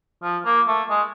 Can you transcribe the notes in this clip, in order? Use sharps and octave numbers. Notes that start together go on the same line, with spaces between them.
F3
A#3
A3
G#3